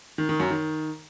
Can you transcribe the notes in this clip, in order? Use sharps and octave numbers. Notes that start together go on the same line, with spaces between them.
D#3
D#3
F#2
D#3